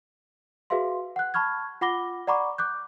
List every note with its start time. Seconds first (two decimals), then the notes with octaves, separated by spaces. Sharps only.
0.70 F#4 G#4 B4 E5 F5 C6
1.16 F#5 F#6
1.34 A5 B5 C#6 F6 G#6
1.81 F4 F#5 B5 D6 A#6 G7
2.27 D5 F#5 A#5 B5 C#6 D6
2.58 D6 F#6 G6